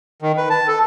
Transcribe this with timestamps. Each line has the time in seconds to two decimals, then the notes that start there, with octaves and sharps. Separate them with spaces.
0.22 D#3
0.37 B4
0.50 A5
0.68 A4